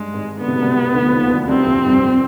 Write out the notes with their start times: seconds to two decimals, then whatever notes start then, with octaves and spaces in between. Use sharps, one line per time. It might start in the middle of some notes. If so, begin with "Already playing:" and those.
Already playing: G2 G#3
0.13 G#1 G#2
0.40 D3 B3
0.48 C3
0.56 B2
0.62 C2 C3
0.94 D2 D3
1.06 F3
1.12 D#2 D#3
1.30 D2 D3
1.48 C2 C3 C4
1.66 F2 F3
1.84 G2 G3
2.02 F2 F3